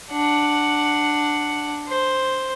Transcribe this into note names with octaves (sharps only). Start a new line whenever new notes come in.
D4 F#5
C5